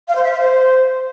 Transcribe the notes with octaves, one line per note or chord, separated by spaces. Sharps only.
F5
C5
E5
F5
C5